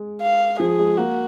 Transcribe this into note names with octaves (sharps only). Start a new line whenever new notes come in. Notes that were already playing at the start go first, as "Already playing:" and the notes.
Already playing: G#3
F5
F3 G#4
G#3
A#3 F#4